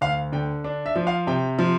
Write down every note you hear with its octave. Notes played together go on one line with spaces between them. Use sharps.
D2 F5
D3 G5
D4
E5
F3
F5
C3 G5
F3